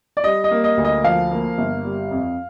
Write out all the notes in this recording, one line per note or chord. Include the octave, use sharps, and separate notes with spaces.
D5
G3 D#5
D#5
A#3
D#5
D2
D#5
F3 F5
A#3
G1
G3
F2